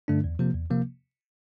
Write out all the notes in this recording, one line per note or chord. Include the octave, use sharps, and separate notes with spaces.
G2 D3 A3 D4
E2
C3 F3 A#3
E2
C3 F3 A#3